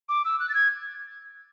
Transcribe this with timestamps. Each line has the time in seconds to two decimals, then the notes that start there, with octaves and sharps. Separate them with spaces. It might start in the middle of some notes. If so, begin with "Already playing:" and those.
0.09 D6
0.25 E6
0.40 F#6
0.49 A6
0.54 G#6